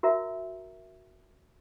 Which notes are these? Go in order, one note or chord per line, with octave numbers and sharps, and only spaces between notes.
F#4 A#4 E5 A#5